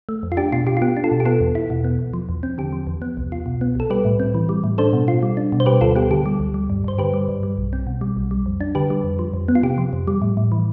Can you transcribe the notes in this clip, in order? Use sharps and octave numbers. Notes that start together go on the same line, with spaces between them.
A3
F2
F4
D4 G4
B2 F4
F4 G4
F4
B3 G4
D4
F4 A4
B2
G4
B3 F4 A4
E2
E4
B2
B3
E2
F3
E2
C4
D3 G4
F3
E2
B3
C2
F4
B2
B3
C2 A4
G3 G4 B4
A2
C4
E3
G3
A2
D4 A4 C5
B2
F4
G3
D4
B2
C5
G3 G4 B4
D2 F4 A4
B3 G4
D3 G4
G3
D2
G3
G2
G2 C5
D3 G4 B4
G3
G2
G3
B1
C4
B2
G3
B1
G3
F2
D4
D3 G4 B4
G3
F2
F3
F2
B3
F4
C3 G4
F3
F2
G3
A2
A2
E3